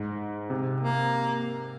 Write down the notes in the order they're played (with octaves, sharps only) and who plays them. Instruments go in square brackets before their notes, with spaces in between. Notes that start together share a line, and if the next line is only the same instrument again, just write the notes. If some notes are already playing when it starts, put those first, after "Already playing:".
Already playing: [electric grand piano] G#2
C3
[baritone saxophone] A#3